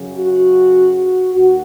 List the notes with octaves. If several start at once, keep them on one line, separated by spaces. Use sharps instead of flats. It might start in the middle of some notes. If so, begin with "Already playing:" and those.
Already playing: F#2 C#3 F#3
F#4
F#4
D#2 F#4